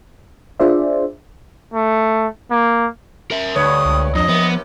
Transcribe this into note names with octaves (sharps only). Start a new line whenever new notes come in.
D4 F4 G#4 C5 D5 E5
A3
A#3
A#4 E5
D2 G2 B4 C#5 D#6
C#2
F2 D4 D#5
C3 F3 A#3 B3